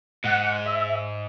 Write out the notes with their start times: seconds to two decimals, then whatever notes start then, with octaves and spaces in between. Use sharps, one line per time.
0.24 G#2 F#5
0.66 E5